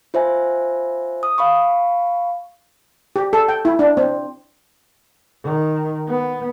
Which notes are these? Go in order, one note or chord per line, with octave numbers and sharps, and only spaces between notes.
F4 C5 E5 G#5
D#6
F5 B5 C#6
G4
A4
G5
E4
D4
C4
D#3
B3